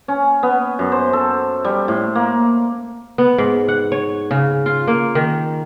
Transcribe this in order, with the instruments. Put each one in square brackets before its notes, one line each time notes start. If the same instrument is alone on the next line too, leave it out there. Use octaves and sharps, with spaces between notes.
[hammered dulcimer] C#4
B3
F#2
C5
A4
G3
A2
A#3
[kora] B3
G#2
F#5
C#5
C#3
F4
A#3
D#3